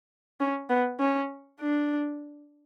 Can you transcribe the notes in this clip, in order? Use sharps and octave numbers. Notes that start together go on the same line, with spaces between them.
C#4
B3
C#4
D4